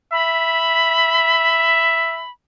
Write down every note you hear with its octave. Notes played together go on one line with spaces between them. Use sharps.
E5 B5